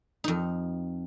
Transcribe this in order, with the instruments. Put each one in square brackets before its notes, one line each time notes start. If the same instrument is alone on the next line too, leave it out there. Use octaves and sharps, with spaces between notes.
[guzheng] F2 D#4